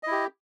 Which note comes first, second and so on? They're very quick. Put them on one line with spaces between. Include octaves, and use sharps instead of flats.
D#5 E4 G4